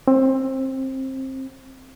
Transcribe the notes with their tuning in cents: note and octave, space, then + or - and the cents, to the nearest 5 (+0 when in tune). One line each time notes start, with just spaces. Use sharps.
C4 +20